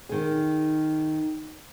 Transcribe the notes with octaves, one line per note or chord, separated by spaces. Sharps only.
D#3 G#4